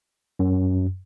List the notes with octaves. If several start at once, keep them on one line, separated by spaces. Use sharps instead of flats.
F#2